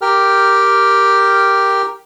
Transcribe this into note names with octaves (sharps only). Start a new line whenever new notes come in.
G4 A#4 G5 F6